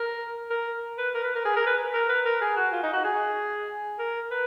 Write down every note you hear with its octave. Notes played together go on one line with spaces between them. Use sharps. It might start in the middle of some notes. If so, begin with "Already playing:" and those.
Already playing: A#4
A#4
B4
A#4
B4
A#4
G#4
A#4
B4
A#4
B4
A#4
G#4
F#4
F4
D#4
F#4
G#4
A#4
B4